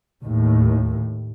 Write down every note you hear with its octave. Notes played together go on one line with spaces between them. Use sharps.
D#2 A2